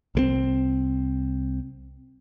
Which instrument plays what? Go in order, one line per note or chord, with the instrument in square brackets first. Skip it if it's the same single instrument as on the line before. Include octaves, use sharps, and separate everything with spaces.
[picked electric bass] C2 G#3 C4